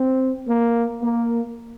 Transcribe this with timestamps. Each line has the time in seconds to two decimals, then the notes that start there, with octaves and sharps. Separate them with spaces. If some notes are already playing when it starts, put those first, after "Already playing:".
Already playing: C4
0.47 A#3
1.02 A#3